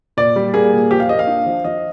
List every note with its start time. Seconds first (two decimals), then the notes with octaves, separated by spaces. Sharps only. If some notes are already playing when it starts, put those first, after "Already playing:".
0.17 A#2 D5
0.36 G3
0.54 A#3 G#4
0.73 A#2
0.91 F3 G4
1.00 F5
1.09 A#3 D#5
1.19 F5
1.27 D4
1.46 F3
1.64 F3 D#5